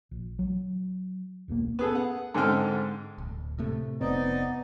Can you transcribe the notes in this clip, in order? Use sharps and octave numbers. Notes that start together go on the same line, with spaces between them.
A#1
F#3
D#1 B1 A#2 A#3
B3 G#4 A4
F#5
G#2 D3 C4 A4 G5 F6
D1
A2 C3 A3
F1 B3 C4 D#4 D5 D#5